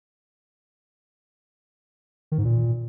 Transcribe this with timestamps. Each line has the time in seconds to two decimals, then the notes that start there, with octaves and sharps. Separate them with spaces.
2.32 D#3
2.38 G#2
2.45 A#2